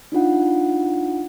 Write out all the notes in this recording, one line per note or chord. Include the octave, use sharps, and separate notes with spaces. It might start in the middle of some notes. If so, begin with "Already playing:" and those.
D4 D#4 F4 F#5